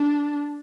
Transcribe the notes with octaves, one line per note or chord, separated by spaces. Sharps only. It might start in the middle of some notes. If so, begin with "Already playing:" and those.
Already playing: D4